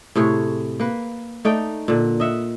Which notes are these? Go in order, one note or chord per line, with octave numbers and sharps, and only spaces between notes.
A2 C3 G#4 C#5
A#3 B4
A3 D#4 D5 G5
A#2 D3
D#5 E5 F#5